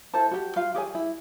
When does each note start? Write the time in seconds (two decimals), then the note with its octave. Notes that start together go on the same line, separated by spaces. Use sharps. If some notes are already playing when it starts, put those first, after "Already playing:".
0.14 E4 A4 C5 A5
0.31 F#4 G4
0.56 F4 F5
0.74 G4 G#4 C#5 G#5
0.95 E4